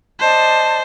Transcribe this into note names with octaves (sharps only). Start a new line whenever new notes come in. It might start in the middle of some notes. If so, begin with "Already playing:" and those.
C5 D5 D#5 A5